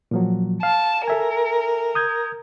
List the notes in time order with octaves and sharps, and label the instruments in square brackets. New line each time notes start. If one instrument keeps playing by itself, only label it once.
[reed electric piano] A#2 F3 F#3
[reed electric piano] F5 [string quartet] A5
[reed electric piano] A4 E5 G#5 [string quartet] A#4
[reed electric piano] D#6 G6 G#6